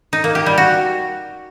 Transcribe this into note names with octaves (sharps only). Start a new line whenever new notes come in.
D#4
A#3
G4
G3
F#4